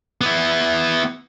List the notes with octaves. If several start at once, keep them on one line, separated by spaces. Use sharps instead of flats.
B3 E4